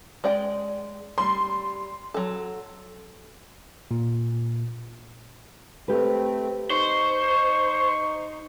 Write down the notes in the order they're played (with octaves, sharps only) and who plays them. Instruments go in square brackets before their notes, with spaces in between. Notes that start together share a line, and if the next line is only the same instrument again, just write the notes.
[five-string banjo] G#3 D5 G5
[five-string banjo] G3 [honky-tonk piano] C6
[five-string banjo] F#3 A4
[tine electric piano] A#2
[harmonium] A3 C4 [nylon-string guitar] G4 B4
[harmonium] D#4 [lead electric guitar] C5 [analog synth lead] C#6